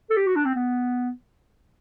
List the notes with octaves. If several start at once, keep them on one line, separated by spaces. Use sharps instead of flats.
A4
G4
F#4
D4
C4
B3